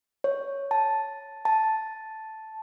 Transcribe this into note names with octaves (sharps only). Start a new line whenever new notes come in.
C#5
A5
A5